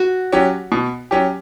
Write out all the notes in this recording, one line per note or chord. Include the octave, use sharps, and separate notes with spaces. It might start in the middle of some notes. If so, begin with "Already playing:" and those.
Already playing: F#4
F#3 C#4 G4
B2
F#3 C#4 G4